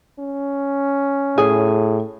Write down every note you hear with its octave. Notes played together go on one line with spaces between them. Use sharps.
C#4
A2 G#4